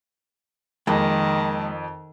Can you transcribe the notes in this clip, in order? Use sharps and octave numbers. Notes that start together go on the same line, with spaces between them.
F2 D#3 G#3 A#3 A5